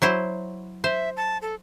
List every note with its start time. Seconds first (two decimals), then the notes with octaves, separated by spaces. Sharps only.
0.02 F#3 E4 C5
0.84 C5 E5
1.17 A5
1.42 A4